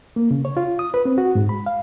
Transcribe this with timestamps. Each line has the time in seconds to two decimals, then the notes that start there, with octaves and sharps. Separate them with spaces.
0.16 A#3
0.31 C#3
0.45 C#5
0.57 F4
0.79 D#6
0.94 B4
1.05 C4
1.18 F#4
1.35 G#2
1.49 B5
1.66 F5